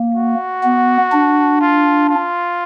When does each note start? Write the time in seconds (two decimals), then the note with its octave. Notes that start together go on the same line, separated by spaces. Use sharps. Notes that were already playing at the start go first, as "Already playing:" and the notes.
Already playing: A#3
0.15 F#4
0.63 B3
1.12 D4
1.61 F4
2.10 F4